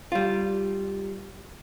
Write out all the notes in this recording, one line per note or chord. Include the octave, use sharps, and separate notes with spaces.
G3 F4